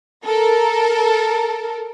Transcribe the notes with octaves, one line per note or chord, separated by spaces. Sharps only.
A4 A#4